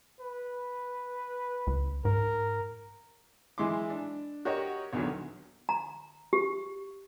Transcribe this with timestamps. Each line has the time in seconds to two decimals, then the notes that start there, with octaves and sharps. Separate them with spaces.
0.20 B4
1.67 C#2
2.05 G#2 A#4
3.58 E3 G#3 E4 C6 D6
3.90 D4
4.45 F#4 G4 A#4 C#5 D#5 F#5
4.93 B1 E2 D3 D#3 F#3
5.69 A#5
6.33 G4